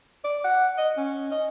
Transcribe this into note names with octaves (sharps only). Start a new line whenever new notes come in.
D5
F#5
D#5
C#4
D#5